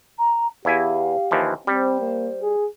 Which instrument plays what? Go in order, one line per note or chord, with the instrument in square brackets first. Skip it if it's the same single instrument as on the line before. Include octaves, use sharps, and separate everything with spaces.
[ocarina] A#5
[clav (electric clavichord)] E2 E4 G#5 [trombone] G4 [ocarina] F5
[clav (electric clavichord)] D#2 E3 F3
[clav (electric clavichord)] G3 [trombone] C4 [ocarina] C5
[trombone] A#3
G#4